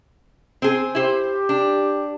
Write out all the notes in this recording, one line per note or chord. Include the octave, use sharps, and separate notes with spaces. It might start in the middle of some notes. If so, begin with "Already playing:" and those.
C4 G#4
E4 G4 C5
D4